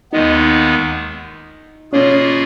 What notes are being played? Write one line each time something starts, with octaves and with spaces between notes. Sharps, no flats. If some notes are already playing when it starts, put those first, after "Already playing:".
D#2 D#3 G#3 B3 D#4
B2 A#3 C#4 F4 G#4